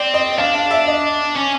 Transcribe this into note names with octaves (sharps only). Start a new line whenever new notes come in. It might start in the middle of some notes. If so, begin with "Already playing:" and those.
Already playing: C4 D5
D#5
D4 F5
F5
E5
D#5
C#4